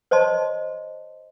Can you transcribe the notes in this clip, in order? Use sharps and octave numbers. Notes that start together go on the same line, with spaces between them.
C5 C#5 D#5 A5 C6